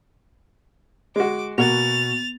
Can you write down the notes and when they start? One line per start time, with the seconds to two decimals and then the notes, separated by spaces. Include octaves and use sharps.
1.16 G#3 F#4 D6
1.58 B2 A#3 F#4 A6 F7